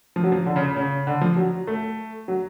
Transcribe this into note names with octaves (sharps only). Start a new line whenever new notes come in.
F3
F#3
F3
D3
C#3
C#3
C#3
D3
F3
F#3
A3
F#3